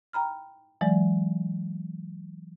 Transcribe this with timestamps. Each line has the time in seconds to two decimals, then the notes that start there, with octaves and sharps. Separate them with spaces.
0.13 G5 A#5 B5 F6
0.81 E3 F#3 G#3 D5